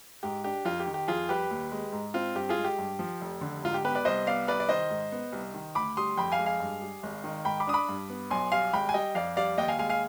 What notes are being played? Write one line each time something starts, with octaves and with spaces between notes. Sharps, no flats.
G#2 G4
D4 G4
F2 F4
G4
D#3
G4
F2 F4 G#4
G3 G4 B4
D#2
G#3
G#2
C4 F4
G2 G4
F4 G#4
G#3
G4
G2
F3
F1
D3
G#2 F4
G4
B3 G4 B4
B4 D5
C2 C5 D#5
B3 D5 F5
C2 B4 D5
D5
D#3 C5 D#5
G#2
B3
C2
D#3
D2 B5 D6
G3 C6 D#6
F2 G5 B5
F5 G#5
G#3
F5 G#5
G2
G3
G#1
D#3
G#2 G5 B5
B5 D6
D4 D#6
B5 D6
G2
B3
B1 G#5 C6
G3 F5 G#5
G#1 G5 B5
G#5
G3 D#5 G5
F2 D5 F5
G3 D5 F5
D#2 D#5 G5
F5 G#5
G#3 F5 G#5
F5 G#5